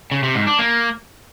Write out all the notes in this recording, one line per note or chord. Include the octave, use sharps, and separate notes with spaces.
C#3
C3
G#2
D4
A#3